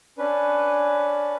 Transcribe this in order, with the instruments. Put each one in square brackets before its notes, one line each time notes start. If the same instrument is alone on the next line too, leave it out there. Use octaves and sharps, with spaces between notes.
[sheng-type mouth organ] C#4 D4 B4